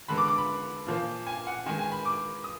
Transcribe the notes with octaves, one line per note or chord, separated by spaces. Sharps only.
D3 G#3 B3 B5
D6
D6
B5
A#2 F3 A#3
G#5
F#5
D#3 G#3 B3 G#5
G#5
B5
D6
D#6